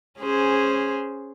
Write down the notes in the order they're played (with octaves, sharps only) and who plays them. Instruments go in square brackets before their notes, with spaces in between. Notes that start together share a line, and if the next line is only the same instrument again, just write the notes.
[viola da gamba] C#4 G#4 C5